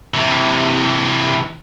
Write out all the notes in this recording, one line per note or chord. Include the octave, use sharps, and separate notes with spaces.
C3 E3